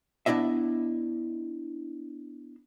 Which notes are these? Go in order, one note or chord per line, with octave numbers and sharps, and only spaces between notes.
B3 D4 E4 D#5 E5